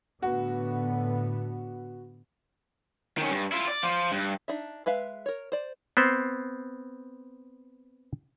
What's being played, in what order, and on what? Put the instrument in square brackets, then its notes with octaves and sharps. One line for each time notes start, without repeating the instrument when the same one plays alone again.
[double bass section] A2 D3 B3 [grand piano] F#4
[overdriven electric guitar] D#3 C#4
G2
E4 F4
D5
F3 F4
G2
[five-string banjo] D4 D#4 E5
G#3 B4 E5 F5
A#4 C#5
C5 D5
[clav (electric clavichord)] B3 C4 C5